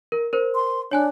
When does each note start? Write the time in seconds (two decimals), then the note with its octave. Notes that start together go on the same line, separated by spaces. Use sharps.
0.12 A#4
0.33 A#4 C5
0.55 C6
0.91 D4 C#5 G#5 F#6